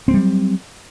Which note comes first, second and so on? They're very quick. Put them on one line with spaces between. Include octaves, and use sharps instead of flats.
C4 B3 G3 F#3